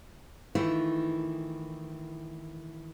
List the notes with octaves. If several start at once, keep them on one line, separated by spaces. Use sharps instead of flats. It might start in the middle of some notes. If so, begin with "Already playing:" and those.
D#3 E3 A3 E4 F4